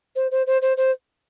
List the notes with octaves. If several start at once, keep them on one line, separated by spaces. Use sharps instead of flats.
C5
C5
C5
C5
C5